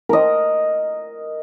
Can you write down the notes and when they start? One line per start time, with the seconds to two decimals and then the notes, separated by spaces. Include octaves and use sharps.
0.09 A#4 D#5